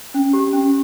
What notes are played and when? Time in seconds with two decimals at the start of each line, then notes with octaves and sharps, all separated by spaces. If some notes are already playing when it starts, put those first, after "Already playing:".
0.14 C#4
0.33 G4
0.53 C#4